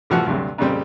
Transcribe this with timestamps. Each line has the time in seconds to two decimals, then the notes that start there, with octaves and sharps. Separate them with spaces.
0.10 C2 A2 E3 F3 F#4 F#5
0.26 D2 G2 C3 F#3
0.58 F2 A#2 C#3 G3 C4